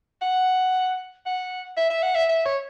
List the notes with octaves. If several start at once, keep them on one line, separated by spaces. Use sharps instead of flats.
F#5
F#5
E5
E5
F#5
E5
E5
C#5